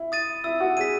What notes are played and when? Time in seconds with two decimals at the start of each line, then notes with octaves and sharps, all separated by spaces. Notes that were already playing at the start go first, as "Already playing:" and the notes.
Already playing: E4
0.12 D#6 A6 D#7
0.44 E4 E6
0.60 F#4
0.77 G#4 B6 D#7